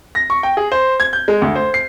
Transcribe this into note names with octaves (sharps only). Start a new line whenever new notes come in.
A#6
C#6
G5
G#4
C5
G#6
G6
G#3
D2
C5
C7